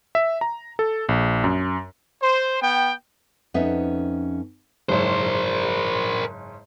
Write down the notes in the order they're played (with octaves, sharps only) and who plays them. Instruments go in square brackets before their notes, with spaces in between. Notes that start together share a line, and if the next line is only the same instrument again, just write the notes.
[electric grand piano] E5
A#5
A4
A#1
F#2
[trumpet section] C5
B3 G5
[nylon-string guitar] F2 B3 C#4 D#4 E5
[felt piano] F#1 G#2 C#5 [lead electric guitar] A#4 C5